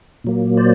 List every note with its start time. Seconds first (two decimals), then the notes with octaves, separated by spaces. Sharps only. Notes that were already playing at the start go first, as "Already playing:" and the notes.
0.24 A#2 F#3 A#3
0.57 C5 D5